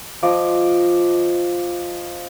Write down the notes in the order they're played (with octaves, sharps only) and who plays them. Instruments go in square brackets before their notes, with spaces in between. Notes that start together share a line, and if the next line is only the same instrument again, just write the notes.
[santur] F3 D#5 D6